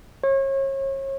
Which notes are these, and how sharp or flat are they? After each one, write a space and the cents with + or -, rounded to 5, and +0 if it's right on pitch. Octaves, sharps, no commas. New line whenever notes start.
C#5 -35